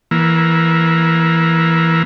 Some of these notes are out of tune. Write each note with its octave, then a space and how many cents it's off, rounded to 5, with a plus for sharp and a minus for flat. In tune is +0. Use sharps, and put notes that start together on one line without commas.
E3 +0 A#3 +20